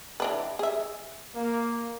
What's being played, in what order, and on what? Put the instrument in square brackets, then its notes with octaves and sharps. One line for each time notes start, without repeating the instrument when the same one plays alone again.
[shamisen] E3 D4 B4
G#4 E5
[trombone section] A#3